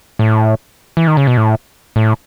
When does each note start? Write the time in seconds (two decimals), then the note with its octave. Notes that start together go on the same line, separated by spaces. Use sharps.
0.19 A2
0.97 E3
1.07 D#3
1.17 C#3
1.27 B2
1.37 A2
1.96 A2